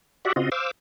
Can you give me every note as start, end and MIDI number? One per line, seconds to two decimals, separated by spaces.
0.25 0.33 66
0.25 0.33 67
0.25 0.33 74
0.25 0.33 76
0.25 0.33 78
0.36 0.50 49
0.36 0.50 60
0.36 0.50 65
0.36 0.50 66
0.36 0.50 75
0.52 0.71 72
0.52 0.71 77
0.52 0.71 86
0.52 0.71 88